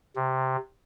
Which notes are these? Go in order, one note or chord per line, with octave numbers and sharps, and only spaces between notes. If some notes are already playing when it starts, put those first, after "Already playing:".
C3